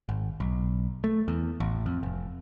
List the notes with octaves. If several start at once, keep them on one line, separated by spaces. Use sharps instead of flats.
G#1
B1
A3
E2
A1
F2
F1